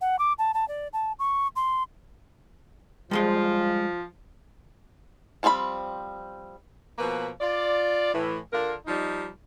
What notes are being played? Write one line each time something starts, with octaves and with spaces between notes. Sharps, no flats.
F#5
D6
A5
A5
D5
A5
C#6
C6
F3 G3 G#3 C6
F3 G3 C4 G#4 B5
B2 F3 A#3 B4
F4 D5
A2 E3
D3 D4 F4 A#4
F3 G3 D#4